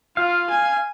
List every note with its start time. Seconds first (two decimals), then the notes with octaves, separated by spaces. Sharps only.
0.17 F4 F5
0.50 G#5